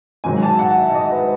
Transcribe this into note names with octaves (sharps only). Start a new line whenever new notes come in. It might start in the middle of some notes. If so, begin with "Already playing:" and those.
G#2 D#3 F#3 G#5
A5
F#5
E5
E5
D#5
B4